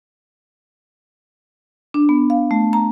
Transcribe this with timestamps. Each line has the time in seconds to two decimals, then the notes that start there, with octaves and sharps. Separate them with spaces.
1.94 D4
2.09 B3
2.30 F5
2.51 A3
2.73 A#5